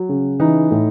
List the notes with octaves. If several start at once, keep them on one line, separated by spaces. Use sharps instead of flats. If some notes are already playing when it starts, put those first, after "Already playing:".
Already playing: F#3
C#3
E3 D#4
A2